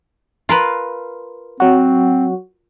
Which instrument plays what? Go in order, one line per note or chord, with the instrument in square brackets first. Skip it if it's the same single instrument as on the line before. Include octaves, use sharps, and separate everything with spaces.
[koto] F4 A#4 B4
[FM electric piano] F#3 F#4 [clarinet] C4